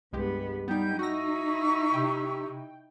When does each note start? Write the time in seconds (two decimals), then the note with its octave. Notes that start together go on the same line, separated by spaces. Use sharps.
0.13 C2 G2 G#3 B3 G4
0.68 G3 B3 D#4 G5 G6
0.99 D#4 E4 F#4 A#5 C#6 E6 A#6
1.94 C3 G5